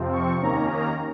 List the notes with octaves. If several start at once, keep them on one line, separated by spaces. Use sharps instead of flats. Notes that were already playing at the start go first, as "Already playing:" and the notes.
Already playing: F2 C3 F3 C4
C#6
D#2 D#3 A#3 C#4 A#5
A#5